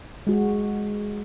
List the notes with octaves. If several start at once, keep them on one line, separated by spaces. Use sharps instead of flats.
G#3 F#4